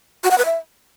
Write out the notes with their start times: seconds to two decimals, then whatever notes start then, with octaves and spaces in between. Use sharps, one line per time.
0.24 F#4
0.31 F#5
0.38 B4
0.45 E5